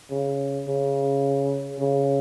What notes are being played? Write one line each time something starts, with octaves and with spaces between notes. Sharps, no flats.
C#3
C#3
C#3